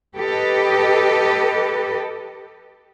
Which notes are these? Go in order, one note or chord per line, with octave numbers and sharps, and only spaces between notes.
G4 A4 B4 D#5